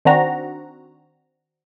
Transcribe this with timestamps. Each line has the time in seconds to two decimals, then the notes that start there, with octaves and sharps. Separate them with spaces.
0.05 D#3 C4 D4 F#4 A#5